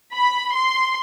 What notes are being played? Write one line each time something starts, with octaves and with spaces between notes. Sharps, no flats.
B5
C6